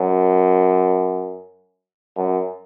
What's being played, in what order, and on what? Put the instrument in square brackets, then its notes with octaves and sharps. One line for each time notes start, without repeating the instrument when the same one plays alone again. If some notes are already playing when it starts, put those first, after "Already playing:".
Already playing: [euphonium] F#2
F#2